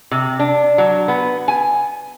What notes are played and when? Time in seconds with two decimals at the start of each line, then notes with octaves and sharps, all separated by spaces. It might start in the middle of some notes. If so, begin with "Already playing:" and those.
0.11 C3
0.39 D4
0.78 F#3
1.08 B3
1.48 G#5